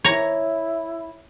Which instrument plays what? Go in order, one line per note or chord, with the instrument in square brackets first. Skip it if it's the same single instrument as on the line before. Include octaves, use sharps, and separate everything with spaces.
[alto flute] E4 [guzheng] C#5 A#5